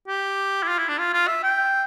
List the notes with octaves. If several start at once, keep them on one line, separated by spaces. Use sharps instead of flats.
G4
E4
F4
E4
D4
F4
F4
E5
G5